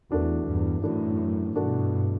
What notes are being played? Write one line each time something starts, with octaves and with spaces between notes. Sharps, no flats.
E2 E3 A3 D4 F#4
E2 G2
F#2 A2 E3 A3 D4 F#4
G2 B2 E3 A3 D4 F#4